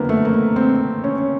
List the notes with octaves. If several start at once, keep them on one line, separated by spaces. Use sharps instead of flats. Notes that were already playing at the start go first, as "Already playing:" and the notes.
Already playing: F#1 F2 D3 A#3 B3
A3
A#3
C4
C#4